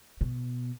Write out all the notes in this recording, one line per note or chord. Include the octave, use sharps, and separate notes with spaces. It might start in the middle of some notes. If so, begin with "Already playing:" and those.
B2